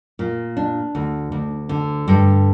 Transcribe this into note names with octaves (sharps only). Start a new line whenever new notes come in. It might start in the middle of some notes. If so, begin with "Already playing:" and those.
A#2
D4
D2
D2
D3
G2